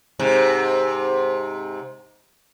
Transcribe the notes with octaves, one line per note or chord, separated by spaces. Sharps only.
G#2 C3